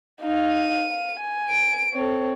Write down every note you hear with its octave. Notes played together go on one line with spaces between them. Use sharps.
D#4 F5
D#7
F5
G#5
D7
C4 A4 C#5